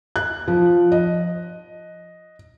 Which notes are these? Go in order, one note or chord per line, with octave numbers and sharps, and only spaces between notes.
F#6
F3
D#5